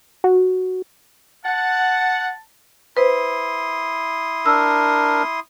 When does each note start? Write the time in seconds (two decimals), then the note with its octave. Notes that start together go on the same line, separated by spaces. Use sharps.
0.24 F#4
1.45 F#5 A5
2.97 E4 B4 C5 C6 D#6
4.46 D4 A#4 E6